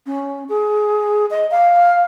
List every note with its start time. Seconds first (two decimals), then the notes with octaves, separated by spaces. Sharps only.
0.06 C#4
0.49 G#4
1.30 D#5
1.51 F5